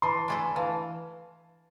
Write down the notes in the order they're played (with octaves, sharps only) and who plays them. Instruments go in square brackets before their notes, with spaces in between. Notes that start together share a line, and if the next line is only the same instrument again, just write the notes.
[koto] E3 [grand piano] A5 C6
[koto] A3 D4 F4 A4 [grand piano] G#5 B5
[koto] E3 [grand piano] F5 A5